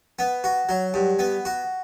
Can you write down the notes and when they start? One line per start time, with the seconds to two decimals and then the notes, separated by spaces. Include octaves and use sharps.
0.19 B3
0.44 F#4
0.69 F#3
0.94 G2
1.19 B3
1.45 F#4